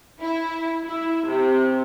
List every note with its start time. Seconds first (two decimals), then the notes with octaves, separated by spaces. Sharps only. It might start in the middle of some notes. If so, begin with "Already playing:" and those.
0.21 E4
0.86 E4
1.29 C3